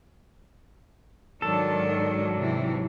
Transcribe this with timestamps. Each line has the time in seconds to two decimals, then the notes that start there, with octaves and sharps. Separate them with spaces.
1.42 G#2 D#3 F#3 D4 A4
2.36 C3 E3